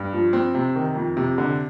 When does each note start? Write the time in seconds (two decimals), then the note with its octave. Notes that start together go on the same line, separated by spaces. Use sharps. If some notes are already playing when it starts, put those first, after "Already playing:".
Already playing: G2
0.13 F3
0.33 C4
0.55 C3
0.76 D#3
0.96 F2
1.17 C3
1.38 D3